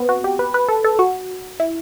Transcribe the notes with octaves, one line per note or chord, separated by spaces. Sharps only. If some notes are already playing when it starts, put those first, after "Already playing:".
Already playing: B3 C4
F#4
G4
B4
B4
A4
A4
F#4
E4